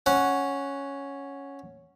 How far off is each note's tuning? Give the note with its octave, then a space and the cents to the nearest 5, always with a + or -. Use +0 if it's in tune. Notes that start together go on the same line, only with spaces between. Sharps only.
C#4 +0 F#5 +0